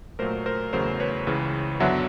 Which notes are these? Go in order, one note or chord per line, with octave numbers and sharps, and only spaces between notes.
A#2 F#3 A3 A#4 C5
A#4 C5
E2 C#3 F#3 A3 A#4 C5
B4 C#5
C#2 C#3 E3
F#2 D3 F#3 B3 D4 E5 F#5